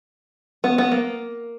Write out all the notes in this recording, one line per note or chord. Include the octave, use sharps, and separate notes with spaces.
B3
B3
A#3